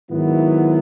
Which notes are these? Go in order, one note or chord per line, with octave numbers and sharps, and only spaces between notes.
G#2 D#3 F#3 B3 E4